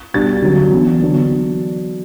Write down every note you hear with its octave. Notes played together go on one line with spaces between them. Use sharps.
B2 G3 D4 A6
D3 F#3 C#4
E3 B3 D4
D3 F#3 B3 D4